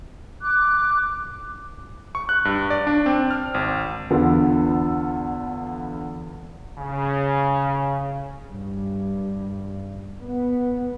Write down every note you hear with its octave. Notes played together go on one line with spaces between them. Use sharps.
D6 F#6
C#6
F#6
G2
D5
D4
C4
F6
G#1
E2 D3 B3 F4 A4
C#3
G2
B3